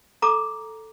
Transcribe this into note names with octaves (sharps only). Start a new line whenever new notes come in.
A4 A#5 D6